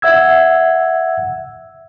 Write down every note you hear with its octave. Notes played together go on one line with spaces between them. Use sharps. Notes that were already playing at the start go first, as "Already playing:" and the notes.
E5 F#5 E6 G#6